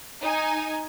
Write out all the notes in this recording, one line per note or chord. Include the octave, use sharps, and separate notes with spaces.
D#4 G#5